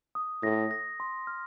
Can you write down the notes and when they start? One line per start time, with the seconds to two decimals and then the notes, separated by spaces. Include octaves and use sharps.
0.15 D#6
0.43 A2 A#6
0.71 A#6
1.00 C6
1.27 F6